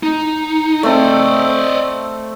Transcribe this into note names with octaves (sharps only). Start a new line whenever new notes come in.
D#4
A3 C4 D5 D#5